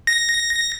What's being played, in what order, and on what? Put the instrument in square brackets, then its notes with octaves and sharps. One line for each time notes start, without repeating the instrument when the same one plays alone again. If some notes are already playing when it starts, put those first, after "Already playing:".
[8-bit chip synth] A#6